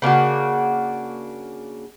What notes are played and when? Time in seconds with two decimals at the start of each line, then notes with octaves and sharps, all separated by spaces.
0.02 C#3 A#3 D4 F#4